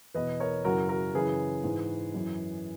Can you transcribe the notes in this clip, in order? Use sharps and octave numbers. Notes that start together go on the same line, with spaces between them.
E2 B2 B4 D#5
A#4 C#5
F#2 C#3 E3 F#4 A#4
F#4 A#4
F#2 C#3 E3 G#4 B4
G#2 E3
F#2 E3